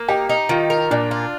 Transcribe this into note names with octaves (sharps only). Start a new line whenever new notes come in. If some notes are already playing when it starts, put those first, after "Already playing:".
Already playing: A#3
D#4 G4
D#4
D#3 F4
A#4
A#2 D4
F4